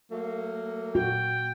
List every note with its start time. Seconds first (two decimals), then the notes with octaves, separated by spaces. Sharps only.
0.11 F#3 A3 A#3
0.95 A#2 F#4 G5